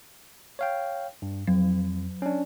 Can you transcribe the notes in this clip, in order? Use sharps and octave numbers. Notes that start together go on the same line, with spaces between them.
C#5 F5 G5
G2
F2 F#3
C#4 D4